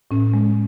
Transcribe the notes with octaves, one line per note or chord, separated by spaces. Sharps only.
A2 C#4
G#3